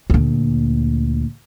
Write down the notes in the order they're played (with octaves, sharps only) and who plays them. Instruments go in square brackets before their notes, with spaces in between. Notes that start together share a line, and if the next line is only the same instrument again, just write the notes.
[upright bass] D2 A#2